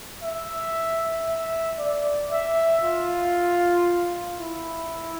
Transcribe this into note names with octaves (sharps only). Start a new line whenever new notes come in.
E5
E5
D5
E5
F4
E4